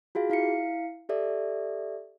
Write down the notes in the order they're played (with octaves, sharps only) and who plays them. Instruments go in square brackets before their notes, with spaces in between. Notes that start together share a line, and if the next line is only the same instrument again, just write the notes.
[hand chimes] F4 F#4 G#4 F5
E4 F5 C7 C#7
G4 A4 D5 E5